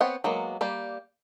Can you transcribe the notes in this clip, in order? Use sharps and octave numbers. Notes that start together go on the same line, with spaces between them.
B3 C4 C#5 F#5
F#3 G#3 A#3 B3
G3 A#3 G4